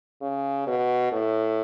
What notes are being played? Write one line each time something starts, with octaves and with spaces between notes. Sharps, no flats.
C#3
B2
A2